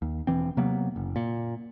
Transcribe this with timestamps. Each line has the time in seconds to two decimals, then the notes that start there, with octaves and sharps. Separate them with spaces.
0.02 D#2
0.27 E1 E3 C4
0.57 C3 F#3 A#3 B3
0.96 F#1
1.16 A#2